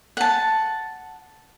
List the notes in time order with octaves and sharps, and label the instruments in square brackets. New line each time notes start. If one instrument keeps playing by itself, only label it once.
[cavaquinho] F#5 A5